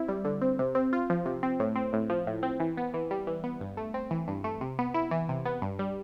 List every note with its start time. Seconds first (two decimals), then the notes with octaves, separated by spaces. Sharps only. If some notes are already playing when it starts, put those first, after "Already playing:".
Already playing: C4 E4
0.08 G3
0.25 D3
0.41 C4
0.59 C3
0.75 C4
0.93 F4
1.10 F3
1.26 C3
1.43 C4
1.60 A2
1.76 C4
1.93 A2
2.10 F3
2.27 A2
2.43 C4
2.60 E3
2.77 B3
2.94 E3
3.11 G3
3.27 E3
3.44 B3
3.61 G2
3.77 A3
3.94 C4
4.11 E3
4.28 G2
4.44 A3
4.61 C3
4.79 B3
4.94 E4
5.11 E3
5.29 C3
5.45 B3
5.62 G2
5.79 G3